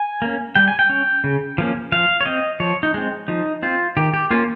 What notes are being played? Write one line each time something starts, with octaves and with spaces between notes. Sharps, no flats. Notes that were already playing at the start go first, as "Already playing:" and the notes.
Already playing: G#5
A#3 C#4
G3 G5
G#5
G5
C#4
C#3
F3 A#3 C#4
F3 F5
C#5
C4 D#5
F3 C#5
D#4
G#3 C4
F3 D#4
C4 F4
D#3 G4
G4
A#3 C#4 F4